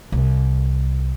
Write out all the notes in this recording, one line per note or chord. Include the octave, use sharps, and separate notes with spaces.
C2